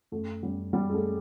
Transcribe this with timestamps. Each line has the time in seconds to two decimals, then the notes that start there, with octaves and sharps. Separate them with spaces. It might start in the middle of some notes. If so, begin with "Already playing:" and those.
0.12 F#2 A3
0.43 F#2 G3
0.73 F#2 G3
0.90 G#3
0.94 A3